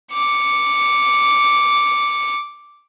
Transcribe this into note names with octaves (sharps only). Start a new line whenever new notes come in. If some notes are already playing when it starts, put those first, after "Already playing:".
D6 C#7